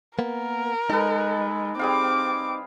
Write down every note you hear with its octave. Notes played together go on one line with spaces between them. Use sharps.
A#3 B3 A#4
G#3 D#4 A4 B4
G3 C4 G#4 F5 D6